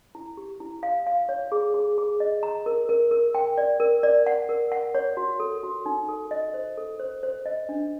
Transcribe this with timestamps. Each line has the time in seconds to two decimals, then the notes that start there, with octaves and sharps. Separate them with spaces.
0.15 E4
0.37 G4
0.60 E4
0.83 F5
1.07 F5
1.29 C#5
1.52 G#4
1.74 G#4
1.98 G#4
2.20 D#5
2.43 A#5
2.66 A#4
2.89 A#4
3.11 A#4
3.35 G5
3.58 D5
3.80 A#4
4.03 D5
4.26 F#5
4.49 A#4
4.72 F#5
4.95 C#5
5.17 F#4
5.40 A4
5.63 F#4
5.86 D#4
6.09 A4
6.31 D#5
6.54 C5
6.78 A4
6.99 C5
7.23 C5
7.46 D#5
7.69 D4